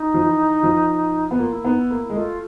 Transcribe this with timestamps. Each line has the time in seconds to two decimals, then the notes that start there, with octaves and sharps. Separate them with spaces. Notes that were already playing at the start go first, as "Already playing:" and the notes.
Already playing: D#4
0.14 F3
0.24 E3
0.63 F3
1.31 B3
1.39 A#3 F4
1.52 E4
1.65 B3 D#4
1.78 E4
1.91 A#3
2.10 G#3
2.15 A3 F4